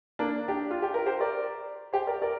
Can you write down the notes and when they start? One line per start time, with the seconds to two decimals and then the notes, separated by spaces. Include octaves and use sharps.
0.19 A#3 D4
0.48 D4 G4
0.71 F4
0.82 G4
0.94 A#4
1.06 G4 C5
1.20 A#4 D5
1.93 G4 C5
2.07 A#4 D5
2.22 A#4 D5